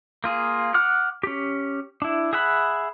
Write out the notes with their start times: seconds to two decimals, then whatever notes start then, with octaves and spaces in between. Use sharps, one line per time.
0.24 A#3 F4 G#4
0.74 F#5 D6 F6 F#6
1.23 C#4 G4
2.02 D4 E4
2.33 G#4 E5 F#5 B5